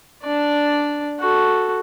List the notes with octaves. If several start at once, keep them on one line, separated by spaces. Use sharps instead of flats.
D4 D5
F#4 A4